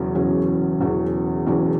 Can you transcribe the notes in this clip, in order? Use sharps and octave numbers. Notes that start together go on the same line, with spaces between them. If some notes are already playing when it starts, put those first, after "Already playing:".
Already playing: E1 E2 C#3 F#3 C#4
E1 E2 C#3 F#3 C#4
E1 E2 C#3 F#3 C#4
E1 E2 C#3 F#3 C#4